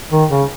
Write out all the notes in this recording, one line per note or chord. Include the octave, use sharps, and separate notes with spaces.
D#3
C#3